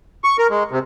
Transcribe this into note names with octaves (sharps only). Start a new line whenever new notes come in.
C#6
A#4
G#3
C3